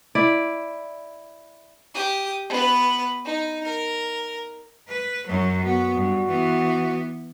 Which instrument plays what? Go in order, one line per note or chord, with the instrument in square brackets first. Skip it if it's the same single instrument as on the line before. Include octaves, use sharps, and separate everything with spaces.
[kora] E4 D5
[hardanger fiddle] G4 D#6
B3 B4
D#4
A#4
[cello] B4
F#2 F#3
[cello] B3 [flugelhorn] F#4
[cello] G2
E3 B3